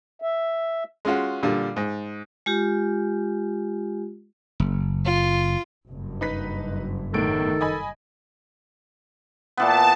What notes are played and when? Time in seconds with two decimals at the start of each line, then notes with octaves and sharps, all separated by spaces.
0.22 E5
1.05 G#3 C#4 F4 F#4
1.43 A#2 D3 G3
1.76 G#2
2.46 G#3 F4 G4
4.60 F#1
5.05 F4
5.88 F#1 G2
6.21 D#4 B4 B6
7.13 E2 A2 D#3 A4 D7
7.61 D#5 G#5 B5
9.57 A#2 E3 B3 A5